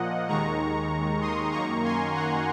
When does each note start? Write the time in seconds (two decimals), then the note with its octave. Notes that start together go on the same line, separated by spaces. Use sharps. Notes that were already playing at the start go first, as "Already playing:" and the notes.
Already playing: A#2 F3 A#3 D#5 F#5
0.28 D#2 D#3 G#3 A#5 C#6
1.21 C6 D#6
1.52 F#2 D#3 A#3 A#5 C#6
1.84 G#5 C6
2.14 F#5 A#5